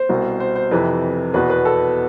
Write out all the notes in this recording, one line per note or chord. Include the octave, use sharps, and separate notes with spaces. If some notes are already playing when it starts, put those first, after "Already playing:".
Already playing: C5
C2 B2
C5
C5
F2 C3 E3 B4
E2 B2 B4
B4
A4